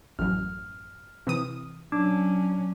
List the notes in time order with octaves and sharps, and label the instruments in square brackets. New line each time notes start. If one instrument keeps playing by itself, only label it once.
[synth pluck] A1 F#2 [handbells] F6
[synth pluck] C3 E3 D#6
[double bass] F#3 C#4 [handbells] D4 D6